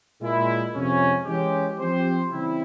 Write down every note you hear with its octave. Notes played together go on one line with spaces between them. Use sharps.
A#2 G#3 E4
F2 C3 F3 G#3 C#4
E3 G#3 C#4 G4
F3 C4 G4 C5
C#3 E3 G3 C4 E4